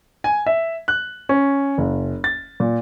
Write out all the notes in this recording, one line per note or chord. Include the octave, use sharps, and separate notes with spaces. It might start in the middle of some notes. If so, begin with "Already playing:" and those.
G#5
E5
F#6
C#4
F#1
A6
A#2